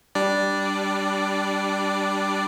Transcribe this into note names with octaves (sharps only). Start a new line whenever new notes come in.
G3 D4 D5